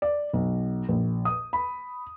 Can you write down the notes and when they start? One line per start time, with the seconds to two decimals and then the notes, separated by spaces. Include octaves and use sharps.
0.02 D5
0.33 B1
0.89 A#1
1.25 D#6
1.53 B5